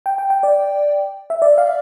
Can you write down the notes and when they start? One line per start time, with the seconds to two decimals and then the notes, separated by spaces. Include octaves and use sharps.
0.06 G5
0.18 G5
0.30 G5
0.43 D5
1.30 E5
1.42 D5
1.58 F5